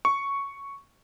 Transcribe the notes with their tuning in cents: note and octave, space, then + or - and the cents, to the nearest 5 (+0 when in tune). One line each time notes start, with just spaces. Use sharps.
C#6 +0